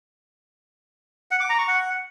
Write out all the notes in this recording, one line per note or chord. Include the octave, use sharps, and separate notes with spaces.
F#5
D6
A#5
C#6
F#5